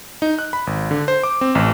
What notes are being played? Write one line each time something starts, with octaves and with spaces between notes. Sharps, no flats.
D#4
F#6
B5
G#1
D3
C5
D6
C4
A1